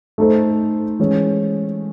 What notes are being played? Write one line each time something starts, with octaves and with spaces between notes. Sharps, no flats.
A3 D#4 A4 C5
E3 G#3 C#4